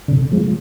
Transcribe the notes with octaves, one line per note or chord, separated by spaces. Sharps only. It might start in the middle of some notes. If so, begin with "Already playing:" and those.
D3
C3
F3 G#3